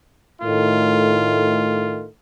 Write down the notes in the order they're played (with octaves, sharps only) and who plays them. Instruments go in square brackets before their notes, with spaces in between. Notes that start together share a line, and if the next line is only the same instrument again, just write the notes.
[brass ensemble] A2 D#3 A3 F4